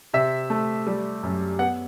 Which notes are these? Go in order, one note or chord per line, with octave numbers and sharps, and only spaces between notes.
C3 E5
A3
G3
F#2
B3 F#5